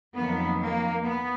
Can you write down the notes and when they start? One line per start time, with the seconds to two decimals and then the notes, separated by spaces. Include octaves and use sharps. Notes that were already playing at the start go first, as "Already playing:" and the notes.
0.15 F2 D#3 F#3 A#3 B3
0.59 A#3
1.02 B3